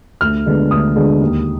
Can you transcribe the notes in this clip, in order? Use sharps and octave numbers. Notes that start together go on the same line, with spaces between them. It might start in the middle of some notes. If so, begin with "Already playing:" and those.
D2 F6
D3 G#3 B3
D2 D#6
D3 G#3 B3
D#2